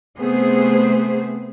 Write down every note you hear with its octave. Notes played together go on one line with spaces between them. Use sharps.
C3 A3 B3 G#4 C5